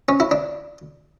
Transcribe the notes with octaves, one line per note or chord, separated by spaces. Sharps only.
C#4
E4
D4